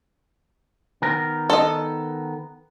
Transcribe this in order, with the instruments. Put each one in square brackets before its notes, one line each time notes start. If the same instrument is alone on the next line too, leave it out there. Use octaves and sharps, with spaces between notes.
[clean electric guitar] D#3 B3 A#4
[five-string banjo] A4 D#5